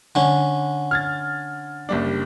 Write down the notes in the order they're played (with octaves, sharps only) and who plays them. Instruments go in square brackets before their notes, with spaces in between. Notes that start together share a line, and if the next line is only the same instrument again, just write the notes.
[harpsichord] D3 C#4
[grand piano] F6 G#6 A6
F#1 G3 D4